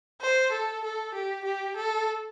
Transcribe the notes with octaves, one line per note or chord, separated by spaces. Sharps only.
C5
A4
A4
G4
G4
A4